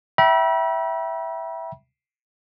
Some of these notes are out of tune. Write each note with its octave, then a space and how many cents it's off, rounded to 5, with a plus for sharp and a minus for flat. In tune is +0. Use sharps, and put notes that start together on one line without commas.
E5 +0 G5 -30 B5 -40